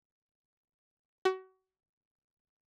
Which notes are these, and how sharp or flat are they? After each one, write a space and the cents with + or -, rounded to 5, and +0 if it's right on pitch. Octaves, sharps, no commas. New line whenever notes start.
F#4 +30